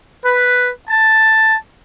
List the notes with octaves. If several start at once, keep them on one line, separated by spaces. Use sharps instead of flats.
B4
A5